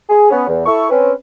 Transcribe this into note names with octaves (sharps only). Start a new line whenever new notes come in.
G#4
B3 C#4
E2
E4 A4 C#6
C4 C#4 B4